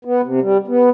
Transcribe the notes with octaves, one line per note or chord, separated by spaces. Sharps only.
B3
C3
G3
B3